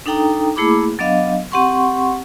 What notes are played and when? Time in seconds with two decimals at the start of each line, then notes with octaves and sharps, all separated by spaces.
0.06 D4 D#4 A4 G5 A#5 D#6
0.56 A3 A#3 E4 G#4 B5 D6
0.99 F#3 B3 D4 D#5 F5
1.52 C4 G4 F#5 C6 C#6